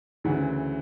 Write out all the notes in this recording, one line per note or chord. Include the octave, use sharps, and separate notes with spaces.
D2 C#3 E3